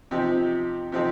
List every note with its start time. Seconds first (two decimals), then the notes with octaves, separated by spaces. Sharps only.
0.11 C3 F3 C4 D#4 G4
0.92 C3 F3 C4 D#4 G4